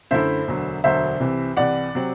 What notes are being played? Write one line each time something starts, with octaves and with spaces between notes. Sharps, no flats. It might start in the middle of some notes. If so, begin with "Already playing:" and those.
F#2 D3 A3 E4 C5 E5
E1 D2 D3 F#3
E1 D2 D3 F#3 C5 E5
C2 C3 E3
C2 C3 E3 D5 F#5
C3 F#3 C4